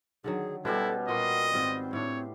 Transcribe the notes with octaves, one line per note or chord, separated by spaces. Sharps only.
D3 D#3 F#3 G#4
B2 G3 C#4 E4 A4 C5
A#2 F#4 A#4 D#5 C6
G#2 D#3 C4 F4
A2 D4 C#5